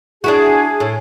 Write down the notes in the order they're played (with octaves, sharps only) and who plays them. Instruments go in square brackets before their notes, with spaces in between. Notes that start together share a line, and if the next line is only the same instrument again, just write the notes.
[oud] D4 E4 F#4 [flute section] G#4
[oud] A2